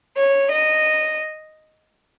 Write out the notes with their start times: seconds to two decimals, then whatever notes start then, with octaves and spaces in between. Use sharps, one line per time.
0.16 C#5
0.50 D#5